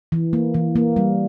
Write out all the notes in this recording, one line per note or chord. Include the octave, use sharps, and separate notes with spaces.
E3
A#3
E3
A#3
G3